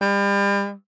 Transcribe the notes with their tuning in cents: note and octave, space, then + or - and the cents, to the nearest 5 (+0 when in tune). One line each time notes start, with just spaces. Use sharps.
G3 +35